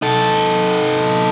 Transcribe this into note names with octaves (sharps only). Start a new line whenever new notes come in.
D#4 A4